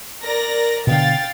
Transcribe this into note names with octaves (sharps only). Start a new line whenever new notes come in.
A#4 D5 A#6
B2 D3 F5 G5 A6